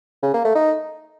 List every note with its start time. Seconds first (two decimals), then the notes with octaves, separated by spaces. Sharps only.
0.23 C#3
0.34 A#3
0.44 A3
0.55 D#4